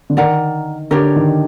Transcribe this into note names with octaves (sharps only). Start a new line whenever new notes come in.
D3
D#3 A#4 D5 F#5 A#5
D3 D4 G4 A#4 C#5
D#3